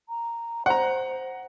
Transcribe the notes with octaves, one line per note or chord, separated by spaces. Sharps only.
A#5
C5 F#5 A#5